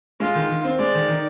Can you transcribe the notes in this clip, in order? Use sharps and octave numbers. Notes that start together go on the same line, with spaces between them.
G#3 F4
D#3
D#3
C4
G#3 D5
D#3
D#3